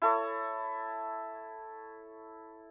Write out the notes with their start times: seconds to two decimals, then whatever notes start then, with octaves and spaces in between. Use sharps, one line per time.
0.02 E4 A4 C#5